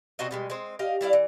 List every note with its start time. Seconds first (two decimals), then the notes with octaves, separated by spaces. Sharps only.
0.19 C3 C4 F#4 D#5
0.31 B2 G3 G#3
0.50 G#3 C4
0.79 G4 D#5 F5
1.01 G3 E4 D5 F5
1.13 E3